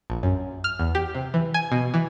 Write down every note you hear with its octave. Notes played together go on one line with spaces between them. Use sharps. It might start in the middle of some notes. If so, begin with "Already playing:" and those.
A#1
F#2
F6
E2
G4
C3
E3
G#5
B2
E3